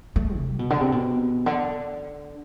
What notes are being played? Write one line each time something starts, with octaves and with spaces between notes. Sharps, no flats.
A3
C3
B2
D3
C3
B2
D3